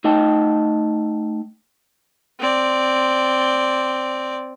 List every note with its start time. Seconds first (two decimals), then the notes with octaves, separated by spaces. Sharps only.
0.04 A3 D#4 D#5 G5 A5
2.40 C4 D5